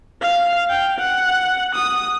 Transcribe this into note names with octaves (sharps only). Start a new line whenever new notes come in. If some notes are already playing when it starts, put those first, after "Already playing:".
F5
G5
F#5
D#6